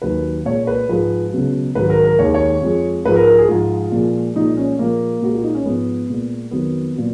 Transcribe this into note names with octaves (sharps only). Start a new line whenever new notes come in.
D#2 D#3 F#3 B4
A#2 G#3 C#5
B4
G#2 F3 G#3 B4
C#2 B2 F#3
G#2 D#3 F#3 B4
A#4
A#4
D#2 D#3 G#3 C#5
C#5
F2 F3 G#3
G#2 F3 G#3 B4
A#4
A#4
G#4
G#2 F3 G#3 F4
A#2 F3 G#3
A#2 F3 G#3 D#4
C#4
A#2 F3 G#3 A#3
A#2 G#3 F#4
F4
D#4
C#4
G#2 F3 G#3 B3
A#2 G#3
F2 D#3 F#3 B3
A#2 F#3